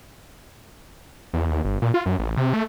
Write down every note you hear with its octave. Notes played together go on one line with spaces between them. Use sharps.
E2
D#2
G1
A#2
F4
F#2
A1
C3
A3